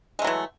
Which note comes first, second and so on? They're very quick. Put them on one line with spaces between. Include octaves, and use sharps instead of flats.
G#3 A3 F#3 E3